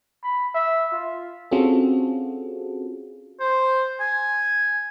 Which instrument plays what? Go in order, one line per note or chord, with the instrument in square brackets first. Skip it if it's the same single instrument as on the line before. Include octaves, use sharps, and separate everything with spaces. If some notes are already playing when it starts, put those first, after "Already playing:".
[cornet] B5
E5
F4
[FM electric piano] C4 C#4 F4 F#4 G#4 A4
[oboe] C5
G#5